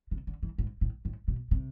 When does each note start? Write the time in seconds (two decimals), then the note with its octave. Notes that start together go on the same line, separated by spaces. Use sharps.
0.11 C3
0.27 D3
0.43 E3
0.58 G#2
0.81 A2
1.05 A2
1.28 B2
1.51 C3